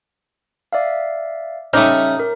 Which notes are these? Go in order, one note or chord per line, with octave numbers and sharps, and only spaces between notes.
D5 E5 F5
C#3 G3 A3 D#4 E5 D6 F6
A#4